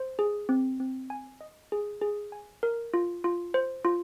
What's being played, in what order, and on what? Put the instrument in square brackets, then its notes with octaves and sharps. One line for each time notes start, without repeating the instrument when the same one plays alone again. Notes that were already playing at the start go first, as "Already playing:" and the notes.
Already playing: [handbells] C5
G#4
C4
C4
G#5
D#5
G#4
G#4
G#5
A#4
F4
F4
C5
F4